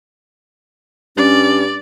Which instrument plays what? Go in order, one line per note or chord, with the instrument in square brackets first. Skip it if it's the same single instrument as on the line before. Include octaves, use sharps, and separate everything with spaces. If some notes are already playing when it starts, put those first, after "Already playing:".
[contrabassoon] G2 [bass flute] C#4 [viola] D5